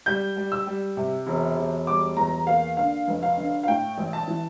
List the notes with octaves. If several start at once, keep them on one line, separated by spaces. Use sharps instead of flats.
G3 G6
G3
E6
G3
C3
E1
E1
G3 D6
E2 A#5
A#3 F5
D3 F5
F1
F5
D3
F5
A2 G5
A1
A5
E3